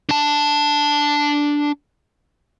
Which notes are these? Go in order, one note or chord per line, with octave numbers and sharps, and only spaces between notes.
D4 A5